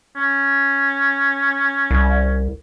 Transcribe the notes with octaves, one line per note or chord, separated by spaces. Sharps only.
C#4
C2